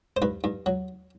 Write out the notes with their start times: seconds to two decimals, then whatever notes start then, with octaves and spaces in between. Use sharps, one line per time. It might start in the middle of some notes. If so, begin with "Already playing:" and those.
0.17 C5
0.22 G2 B4
0.44 G2
0.66 F#3